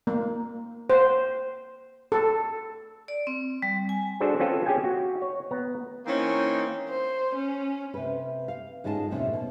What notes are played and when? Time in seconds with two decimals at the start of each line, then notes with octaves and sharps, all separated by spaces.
0.07 A#3
0.90 C5
2.12 A4
3.08 D5
3.27 C4
3.62 G3
3.89 G#5
4.20 D4 F#4 G#4 A4 C5
4.39 C4 C#4 F4 A4 B4
4.66 C#4 G4 G#4 G5 G#5
4.84 F#4
5.22 C#5
5.51 B3 A#5
6.06 E3 A#3 C4 C#4 D#4
6.89 C5
7.36 C#4
7.94 C3 B4
8.48 F5
8.84 G#2 G#3 C#4 F4 G#5 A5
9.10 E2 A2 C3 C#4 E4
9.33 B2